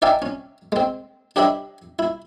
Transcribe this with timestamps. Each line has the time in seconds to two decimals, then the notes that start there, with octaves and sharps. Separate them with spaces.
0.02 D#4 D5 E5 F5 G5 G#5
0.22 C#4
0.72 G#3 C4
1.36 D4 G4 C#5 D#5 E5 B5
1.99 E4